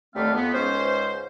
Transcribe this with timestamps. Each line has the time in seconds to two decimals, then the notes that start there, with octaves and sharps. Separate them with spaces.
0.15 D#2 D3 G3 A3 C4 F5
0.34 F2 B3
0.54 C#2 G#2 C#4 C5